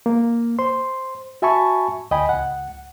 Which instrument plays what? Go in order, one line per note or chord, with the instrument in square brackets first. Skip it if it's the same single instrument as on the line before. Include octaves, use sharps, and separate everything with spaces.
[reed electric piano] A#3
C5 C6
F#4 E5 G#5 A5 B5 C#6
D2 D#5 G5 G#5 B5
C#2 F#5